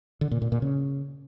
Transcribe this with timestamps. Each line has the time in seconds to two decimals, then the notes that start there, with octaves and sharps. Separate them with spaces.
0.21 D3
0.31 A#2
0.42 A#2
0.52 A#2
0.62 C#3